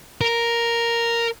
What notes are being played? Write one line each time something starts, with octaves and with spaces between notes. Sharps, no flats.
A#4